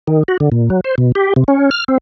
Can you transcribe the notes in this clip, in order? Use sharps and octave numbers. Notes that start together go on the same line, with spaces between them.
D#3
F#4
D3
A#2
F#3
C5
B2
G4
C3
C#4
F6
C4